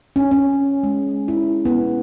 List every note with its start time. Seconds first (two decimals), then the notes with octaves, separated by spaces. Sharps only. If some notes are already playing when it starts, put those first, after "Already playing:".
0.16 C#4
0.31 C#4
0.83 G#3
1.28 E4
1.65 B3